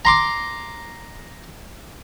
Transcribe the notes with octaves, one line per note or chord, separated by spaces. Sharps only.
A#5 C6 D6